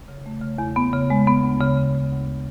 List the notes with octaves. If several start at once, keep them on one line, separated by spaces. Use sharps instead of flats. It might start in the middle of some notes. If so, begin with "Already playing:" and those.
C#3
A3
C#3
E2
B3
C#3
G#3
B3
D2
C#3
C#3
D2
D2